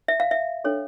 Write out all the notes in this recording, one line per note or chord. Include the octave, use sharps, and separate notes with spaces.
E5
F5
E5
D4 A4 C#5